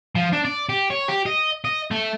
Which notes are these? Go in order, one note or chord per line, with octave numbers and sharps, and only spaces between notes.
F3
D4
D5
G4
C#5
G4
D#5
D#5
A3